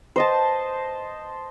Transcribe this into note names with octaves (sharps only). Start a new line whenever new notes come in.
C5 D#5 A5